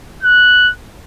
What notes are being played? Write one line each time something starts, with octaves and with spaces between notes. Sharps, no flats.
F#6